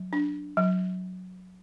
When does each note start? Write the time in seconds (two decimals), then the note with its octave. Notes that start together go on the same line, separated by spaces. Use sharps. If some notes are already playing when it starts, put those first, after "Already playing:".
Already playing: F#3
0.13 D4
0.57 F#3